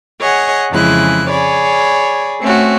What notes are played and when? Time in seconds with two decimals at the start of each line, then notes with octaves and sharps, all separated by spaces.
0.21 G#4 C#5 D#5 F#5
0.71 F2 C#3 E3 G#3 E4 F#6
1.30 G#4 C#5 D5 B5
2.40 A3 C4 C#4 F#4